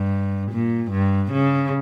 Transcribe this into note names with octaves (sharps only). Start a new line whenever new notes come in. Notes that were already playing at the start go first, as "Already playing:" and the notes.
Already playing: G2
A#2
G2
C#3